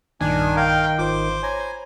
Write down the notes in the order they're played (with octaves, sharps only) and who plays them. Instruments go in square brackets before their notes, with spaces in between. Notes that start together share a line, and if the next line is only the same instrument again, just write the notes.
[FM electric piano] B1 G2 A#2 [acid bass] D#3 [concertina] D4 G#5
[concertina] A#4 F5 [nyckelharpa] G5
[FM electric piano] G#1 F4 [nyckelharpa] C5 [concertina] D6
[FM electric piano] C#5 A#5 B5 [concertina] G#5